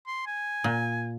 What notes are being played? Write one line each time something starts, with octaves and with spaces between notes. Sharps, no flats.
C6
G#5
A#2